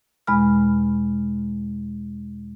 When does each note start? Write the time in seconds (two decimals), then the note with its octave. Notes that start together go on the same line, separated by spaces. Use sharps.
0.27 E2 B2 G#3 B5 F6